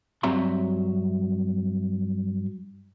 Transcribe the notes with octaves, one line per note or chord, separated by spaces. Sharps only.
G2 F#3 C4 E5 A#5 C6